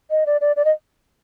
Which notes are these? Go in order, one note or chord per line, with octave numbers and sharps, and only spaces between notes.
D#5
D5
D5
D5
D#5